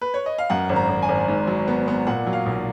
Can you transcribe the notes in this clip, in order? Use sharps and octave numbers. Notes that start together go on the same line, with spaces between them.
B4
C#5
D#5
F5
F#2 F#5
G#1
A#5
G#1
G#5
G#1
G#2
F#3
B3
B3
A#2 F#5
F#3
F5
B1